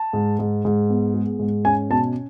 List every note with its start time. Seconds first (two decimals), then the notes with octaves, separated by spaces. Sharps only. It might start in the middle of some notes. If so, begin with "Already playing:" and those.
Already playing: A5
0.13 G#2
0.39 G#2
0.65 G#2
0.90 B3
1.14 G#3
1.39 G#2
1.65 C#4 G#5
1.90 B2 A5